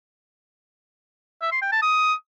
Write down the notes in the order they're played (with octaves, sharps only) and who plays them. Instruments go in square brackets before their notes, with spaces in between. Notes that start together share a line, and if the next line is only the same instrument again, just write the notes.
[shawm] E5
C6
G5
A5
D#6